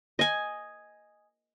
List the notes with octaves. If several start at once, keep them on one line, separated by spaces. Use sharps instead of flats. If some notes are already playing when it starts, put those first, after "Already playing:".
D#5 G#5